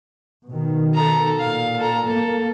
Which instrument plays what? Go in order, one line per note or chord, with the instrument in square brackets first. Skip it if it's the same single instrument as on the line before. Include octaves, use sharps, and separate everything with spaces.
[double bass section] B2 D#3
[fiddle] A4 A#5
[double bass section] A#2 [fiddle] F5
[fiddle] A4 A#5
[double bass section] A#3 [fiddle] A4